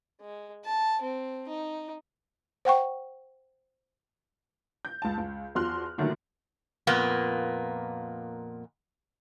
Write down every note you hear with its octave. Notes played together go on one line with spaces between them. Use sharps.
G#3
A5
C4
D#4
C5 F#5 G5 C#6
G6
C#2 A5
C#2
E2 F3 F#4 C6 F6 F#6
A#2 D3 D#3 F#3 A3
F2 A#2 A#3 B3